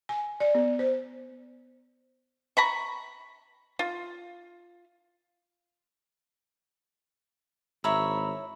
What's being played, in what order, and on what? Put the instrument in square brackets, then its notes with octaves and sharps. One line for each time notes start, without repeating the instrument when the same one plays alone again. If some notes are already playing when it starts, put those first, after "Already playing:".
[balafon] G#5
D5
B3
C5
[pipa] A#5 B5 C#6
F4
[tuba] G#1 [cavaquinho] E4 C#5 [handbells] A#5 B5 E6